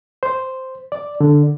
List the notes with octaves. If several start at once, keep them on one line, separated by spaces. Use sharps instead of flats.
C5
D5
D3